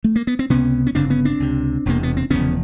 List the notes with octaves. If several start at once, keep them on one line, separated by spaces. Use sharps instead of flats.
A3
A#3
B3
C4
C#2 C3 B3 C#4
C#4
G1 F2 C#3 C4 D4
B3 C#4
C4 D4
C#2 C3
E1 E2 C3 A#3
B3
C4
F1 E2 C#3 B3 C#4